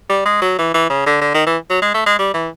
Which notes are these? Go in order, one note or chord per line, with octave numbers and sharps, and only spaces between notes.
G3
G#3
F#3
E3
E3
C#3
D3
D3
D#3
E3
F#3
G#3
A3
G#3
G3
E3